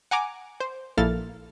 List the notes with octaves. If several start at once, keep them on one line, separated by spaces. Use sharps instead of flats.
F#5 G#5 A#5 D6
C5
A#1 A#3 E4 A4 F6 A6